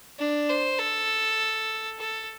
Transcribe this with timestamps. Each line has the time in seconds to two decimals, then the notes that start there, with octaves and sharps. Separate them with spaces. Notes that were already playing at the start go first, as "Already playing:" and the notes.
0.19 D4
0.49 C5
0.79 A4
1.99 A4